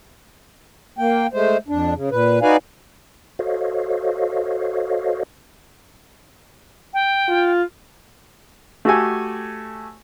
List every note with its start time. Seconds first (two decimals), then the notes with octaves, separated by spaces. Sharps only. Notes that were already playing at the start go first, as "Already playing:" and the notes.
0.98 A#3 G5
1.33 G#3 A3 C5
1.68 F2 D4
1.95 C#3
2.11 A#2 B4
2.42 D#4 F#4 B4 D5 F5 G#5
3.39 F#4 A4 C5 C#5 D#5 F5
6.94 G5
7.28 F4
8.85 A3 F#4 G4 A4 G#5